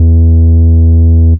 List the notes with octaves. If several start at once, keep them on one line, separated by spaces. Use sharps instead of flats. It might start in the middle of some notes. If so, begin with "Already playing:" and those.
Already playing: E2